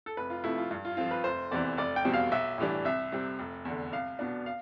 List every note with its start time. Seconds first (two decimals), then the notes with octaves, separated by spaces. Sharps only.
0.06 A4
0.17 F1 B4
0.30 F4
0.44 F2 C3 F3 A3 E4
0.58 F4
0.71 G2
0.85 F4
0.97 F3 C4 F4
1.11 B4
1.24 F1 C5
1.51 E2 C3 E3 D5
1.77 F1 D5
1.96 G5
2.05 E2 B2 G3 C4
2.14 F5
2.31 B1 E5
2.58 A2 E3 G3 D4
2.85 C2 E5
3.12 C3 G3 C4
3.39 F1
3.65 E2 D3
3.92 C2 F5
4.19 B2 B3 D4
4.46 F5